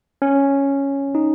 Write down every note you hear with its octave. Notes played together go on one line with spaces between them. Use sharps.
C#4
D#4